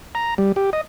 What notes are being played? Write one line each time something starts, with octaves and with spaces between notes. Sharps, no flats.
A#5
G3
G4
D#5